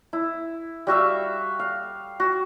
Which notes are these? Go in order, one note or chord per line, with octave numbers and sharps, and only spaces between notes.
E4
G3 F#4 E5 F5
F5
F#4